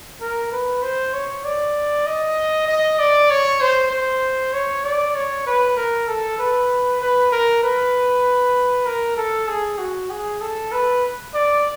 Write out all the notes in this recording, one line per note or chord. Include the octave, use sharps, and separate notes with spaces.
A#4
B4
C5
C#5
D5
D#5
D#5
D5
C#5
C5
C5
C#5
D5
C#5
B4
A#4
A4
B4
B4
A#4
B4
A#4
A4
G#4
F#4
G#4
A4
B4
D5